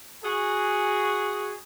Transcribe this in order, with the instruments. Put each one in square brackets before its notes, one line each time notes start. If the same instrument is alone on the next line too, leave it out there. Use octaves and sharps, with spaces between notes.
[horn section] F#4 G#4